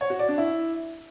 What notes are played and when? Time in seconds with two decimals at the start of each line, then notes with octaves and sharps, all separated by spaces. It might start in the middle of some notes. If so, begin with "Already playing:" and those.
0.01 C#5
0.10 F#4
0.19 D5
0.29 D4
0.38 E4